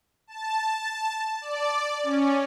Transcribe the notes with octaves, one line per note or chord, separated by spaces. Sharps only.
A5
D5
C#4